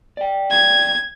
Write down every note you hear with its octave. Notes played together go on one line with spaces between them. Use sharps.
D5 G5
G#6